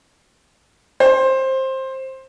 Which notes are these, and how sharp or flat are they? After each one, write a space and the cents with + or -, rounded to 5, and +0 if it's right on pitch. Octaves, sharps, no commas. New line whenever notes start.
C5 +15